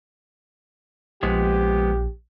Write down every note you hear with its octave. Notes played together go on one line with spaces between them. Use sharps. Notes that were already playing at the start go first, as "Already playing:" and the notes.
A#1 F3 G#3 B3 G4